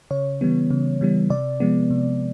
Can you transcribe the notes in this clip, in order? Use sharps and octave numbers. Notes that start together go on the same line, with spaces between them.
C#3 C#5
E3 G3 B3
C#3
E3 G3 B3
C3 D5
F3 G#3 B3
C3